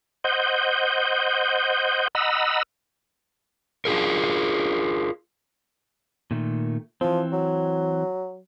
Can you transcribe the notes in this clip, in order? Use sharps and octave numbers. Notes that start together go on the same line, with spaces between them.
C5 D#5 F#5 G6
D#5 F#5 A#5 B5 E6
F4 G#4 A#4
A#2 D#3 A3
E3 F3 C4
F#3